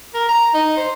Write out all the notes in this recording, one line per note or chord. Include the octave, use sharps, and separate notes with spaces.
A#4
A#5
D#4
C5